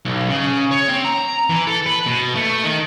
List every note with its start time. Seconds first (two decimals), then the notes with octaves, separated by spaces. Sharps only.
0.05 B1
0.28 C#3
0.71 C#5
0.88 C4
1.04 A#5
1.50 E3
1.67 A4
1.86 B4
2.06 B2
2.35 A3
2.64 D#3